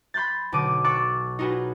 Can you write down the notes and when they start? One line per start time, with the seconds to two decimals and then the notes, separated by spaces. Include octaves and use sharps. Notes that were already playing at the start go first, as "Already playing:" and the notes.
0.14 B5 C6 F#6 G6 A6
0.52 B1 B2 D3 D6 D#7
0.84 C#6 D6 E6 F#6 A6
1.39 D#4 F4 F#4 G#4 B4